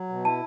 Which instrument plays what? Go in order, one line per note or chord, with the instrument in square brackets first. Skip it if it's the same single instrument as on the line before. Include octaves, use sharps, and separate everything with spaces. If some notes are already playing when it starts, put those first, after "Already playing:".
Already playing: [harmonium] F#3
B2
[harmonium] E4 [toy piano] A5